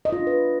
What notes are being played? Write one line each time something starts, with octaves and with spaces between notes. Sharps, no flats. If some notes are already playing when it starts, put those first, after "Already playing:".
D#5
F4
D4
B4